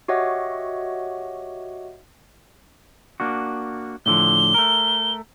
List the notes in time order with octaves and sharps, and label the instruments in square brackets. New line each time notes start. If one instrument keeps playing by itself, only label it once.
[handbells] F#4 G4 C#5 D#5 E5 F#5
[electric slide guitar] A#3 D4 F#4
[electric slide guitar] A2 D3 F3 [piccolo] G7
[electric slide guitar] A3 A#4